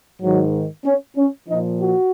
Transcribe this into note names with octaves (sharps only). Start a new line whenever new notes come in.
G#2 D#3 F#3
C#4
C#4
A#2 F3 D#4
F#4